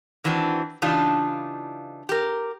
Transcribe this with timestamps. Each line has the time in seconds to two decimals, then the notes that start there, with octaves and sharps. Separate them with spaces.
0.24 D#3 E3 C4 D4 F#4
0.82 C#3 E3 D4 D#4 F4 G4
2.09 G4 A#4